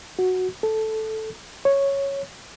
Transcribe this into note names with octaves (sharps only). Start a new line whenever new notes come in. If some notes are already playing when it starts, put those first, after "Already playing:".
F#4
A4
C#5